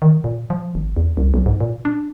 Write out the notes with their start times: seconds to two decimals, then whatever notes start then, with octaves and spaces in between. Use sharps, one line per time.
0.02 D#3
0.24 A#2
0.50 F3
0.75 G#1
0.96 E2
1.17 C2
1.34 B1
1.46 G#2
1.60 A#2
1.85 D4